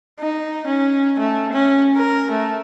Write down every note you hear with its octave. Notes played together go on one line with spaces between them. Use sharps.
D#4
C#4
A3
C#4
A#4
A3